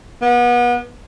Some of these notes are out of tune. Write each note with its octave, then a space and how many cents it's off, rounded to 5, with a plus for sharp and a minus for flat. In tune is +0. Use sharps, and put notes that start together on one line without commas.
B3 -30